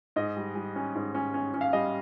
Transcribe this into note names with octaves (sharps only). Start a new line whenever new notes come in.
G#2 D#5
G3
G3
C#4
G#2
C#4
C#4
C#4
F5
G3 D#5